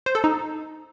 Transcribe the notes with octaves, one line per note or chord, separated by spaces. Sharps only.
C5
A4
D#4